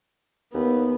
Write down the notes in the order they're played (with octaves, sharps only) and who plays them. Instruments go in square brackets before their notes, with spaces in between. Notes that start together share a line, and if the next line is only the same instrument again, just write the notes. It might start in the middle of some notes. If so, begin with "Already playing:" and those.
[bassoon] D#2 [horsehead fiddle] B3